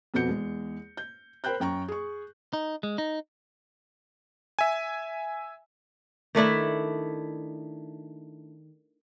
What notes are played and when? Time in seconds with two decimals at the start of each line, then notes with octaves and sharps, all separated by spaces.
0.14 F2 B2 B3 F#4 G6 C#7
0.28 E2 G#3
0.97 G6
1.44 A#4 C5 G5 B5 F#6 G6
1.60 F#2 G5 A#5 C#6
1.88 G#4 C#6
2.53 D#4
2.83 G#3
2.98 D#4
4.59 E5 G#5
6.35 D#3 A3 D4 E4